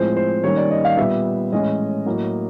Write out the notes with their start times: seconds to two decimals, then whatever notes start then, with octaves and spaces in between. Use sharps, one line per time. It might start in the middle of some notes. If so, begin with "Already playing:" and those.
Already playing: A2 F3 G#3 C4 C5
0.16 C5
0.44 D#3 G3 A#3 C#4 C#5
0.57 D5
0.71 D#5
0.85 F5
0.97 A#2 G3 B3 E5
1.52 A2 E3 G#3 C#4 D#5
2.06 A2 F#3 A#3